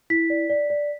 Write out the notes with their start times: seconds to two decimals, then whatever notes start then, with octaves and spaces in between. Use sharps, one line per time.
0.10 E4 B6
0.30 D5
0.50 D5
0.70 D5